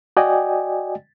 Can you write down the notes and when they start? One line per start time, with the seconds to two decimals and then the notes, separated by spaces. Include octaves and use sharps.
0.17 F#4 D5 D#5 G5 G#5